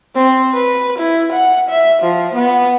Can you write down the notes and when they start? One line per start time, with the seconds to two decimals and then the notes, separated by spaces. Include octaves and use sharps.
0.15 C4
0.54 B4
0.99 E4
1.32 F#5
1.69 E5
2.03 F3
2.35 B3